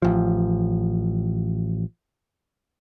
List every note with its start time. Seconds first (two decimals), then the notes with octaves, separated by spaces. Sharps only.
0.02 A1 F3